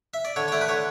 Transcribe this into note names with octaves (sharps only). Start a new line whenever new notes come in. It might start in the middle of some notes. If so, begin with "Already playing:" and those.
E5
D5
D3 C#5
C#5
A3 D5
B4
D3 C#5